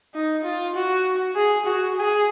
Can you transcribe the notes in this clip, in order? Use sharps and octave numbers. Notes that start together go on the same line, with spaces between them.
D#4
F4
F#4
G#4
F#4
G#4